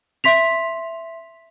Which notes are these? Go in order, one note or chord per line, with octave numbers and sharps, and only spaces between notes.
E5 C6 B6 F7